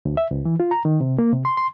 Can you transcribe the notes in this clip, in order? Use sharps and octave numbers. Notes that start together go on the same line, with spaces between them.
D2
E5
C#2
E3
F4
A#5
D#3
C3
A#3
C3
C6
C6